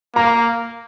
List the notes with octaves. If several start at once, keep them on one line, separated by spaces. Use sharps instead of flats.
A#3 A#5